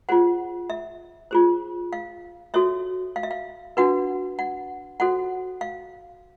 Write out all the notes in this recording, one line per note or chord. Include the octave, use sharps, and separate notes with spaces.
F4 G#4 C5 F#5
E5
F4 G#4 C5
F5
F#4 A4 C#5 E5
F5
E5
F5
D4 F#4 B4 F#5
F#5
F#4 A4 C5 F#5
F5